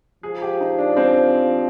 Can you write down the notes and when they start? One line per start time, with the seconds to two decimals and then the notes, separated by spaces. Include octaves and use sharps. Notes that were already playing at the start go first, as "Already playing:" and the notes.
0.23 F3 G#4
0.42 G4
0.61 D#4
0.78 D4
0.92 D4
0.97 C4